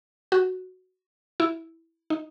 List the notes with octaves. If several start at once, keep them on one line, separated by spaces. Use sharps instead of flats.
F#4
E4
D#4